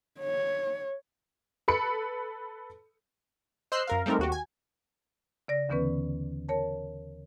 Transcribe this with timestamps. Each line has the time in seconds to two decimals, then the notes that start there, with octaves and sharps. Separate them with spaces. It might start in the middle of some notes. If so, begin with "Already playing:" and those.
0.20 C#5
1.68 A4 B4 B5 C#7
3.72 C5 D#5 C6 E6 F#6 C7
3.87 F#2 A#4 F5
4.06 G3 A3 C4 D#4 A#4
4.19 D#2 F#4 G4
4.32 G#5
5.48 C#3 D5 A#6
5.69 D#2 D3 E3 B3 C#4 B4
6.49 A#4 C#5 A5